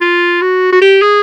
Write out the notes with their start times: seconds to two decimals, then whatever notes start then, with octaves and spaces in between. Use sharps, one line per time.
0.01 F4
0.42 F#4
0.72 F#4
0.81 G4
1.02 G#4